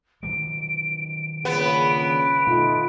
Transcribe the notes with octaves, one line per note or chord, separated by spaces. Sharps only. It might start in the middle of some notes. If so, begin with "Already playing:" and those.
D#3 F#3 G3 D7
G2 A#2 C#3 B3 D7
B2 D#3 A3 D#4 F4